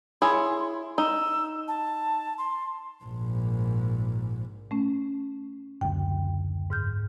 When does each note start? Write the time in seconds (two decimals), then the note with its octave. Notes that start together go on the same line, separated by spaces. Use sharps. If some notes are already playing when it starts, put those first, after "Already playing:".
0.22 E4 G#4 C#5 C6
0.98 D#4 E6
1.68 A5
2.38 C6
3.04 A#1 G#2
4.71 A3 C#4
5.81 F#1 D2 G5
6.70 G#2 F6 G6